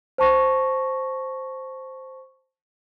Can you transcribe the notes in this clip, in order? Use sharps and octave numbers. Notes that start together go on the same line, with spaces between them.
C5 A5 C#6 A#6